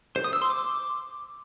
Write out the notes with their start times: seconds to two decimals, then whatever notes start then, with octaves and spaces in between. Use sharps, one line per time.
0.16 C5
0.24 D#6
0.33 E6
0.42 C6
0.50 D6